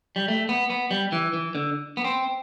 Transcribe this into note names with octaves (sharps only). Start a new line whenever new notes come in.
G3
A3
B3
B3
G3
E3
E3
D3
B3
C4